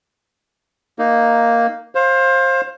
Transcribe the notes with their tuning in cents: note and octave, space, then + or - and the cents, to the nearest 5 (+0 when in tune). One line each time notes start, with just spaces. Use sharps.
A#3 +0 D#4 +0
C5 +25 F5 +10